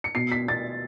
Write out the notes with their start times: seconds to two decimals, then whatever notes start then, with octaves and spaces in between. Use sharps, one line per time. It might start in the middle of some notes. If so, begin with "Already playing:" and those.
0.04 C#7
0.15 B2 C7
0.32 B6
0.48 B2 A6